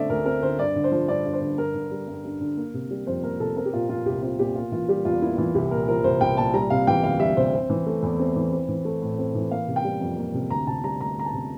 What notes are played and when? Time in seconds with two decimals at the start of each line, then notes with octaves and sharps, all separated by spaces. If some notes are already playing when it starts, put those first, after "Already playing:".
Already playing: D3 A3 C4 D5 E5
0.09 D2 A#4
0.26 C4 A#4
0.42 D3 C5
0.59 G2 D5
0.76 D3
0.84 C5
0.92 F3
1.08 G2 D5
1.25 G2
1.33 C5
1.41 D3
1.58 G2 A#4
1.75 D3
1.91 G3
2.07 G2
2.25 G2
2.40 D3
2.57 A#3
2.74 C3
2.91 G3
3.07 F2 C5
3.23 A#3 A#4
3.40 C3 A4
3.57 C4 A#4
3.65 G4
3.73 A#2 F4
3.89 F3 F4
4.06 C2 G4
4.22 C4 F4
4.39 A#2 G4
4.55 A#3 F4
4.72 E3 F4
4.88 G3 G4
5.05 E2 F4
5.22 A#3 E4
5.38 E3 F4
5.55 C2 G4
5.71 A#2 A#4
5.88 F3 A#4
6.04 C2 C5
6.21 C2 G5
6.37 A#2 A5
6.54 G3 A#5
6.70 C3 F5
6.87 E3 G5
7.03 D2 F5
7.20 G3 E5
7.37 C3 C5
7.53 C4
7.70 E3
7.86 A3
8.03 E2
8.20 C4
8.36 E3
8.52 C4
8.68 E3
8.85 A3
9.02 A2
9.18 C4
9.35 E3
9.51 A#3 F5
9.68 C3
9.76 G5
9.84 G3
10.01 F2
10.18 A#3
10.34 C3
10.50 D2 A#5
10.67 C3 A5
10.84 G3 A#5
11.00 D2 A#5
11.17 D2 A#5
11.25 A5
11.33 C3